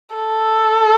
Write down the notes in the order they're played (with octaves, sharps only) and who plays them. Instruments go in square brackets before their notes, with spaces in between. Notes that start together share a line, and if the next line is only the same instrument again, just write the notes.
[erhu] A4